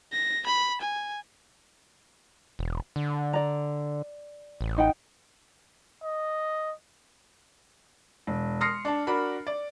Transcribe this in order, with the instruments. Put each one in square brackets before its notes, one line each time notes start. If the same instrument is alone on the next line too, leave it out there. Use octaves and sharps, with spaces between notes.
[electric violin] A#6
B5
G#5
[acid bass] E1
D3
[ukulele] D5 A#5
[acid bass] A1
[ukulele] D#4 F#5 G5
[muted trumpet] D#5
[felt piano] E1
C6 D#6 F6 A#6 C7 C#7
D4 A5
D4 F#4 A#4 B5
D5